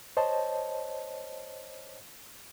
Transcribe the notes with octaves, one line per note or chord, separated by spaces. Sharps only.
C5 C#5 D#5 A5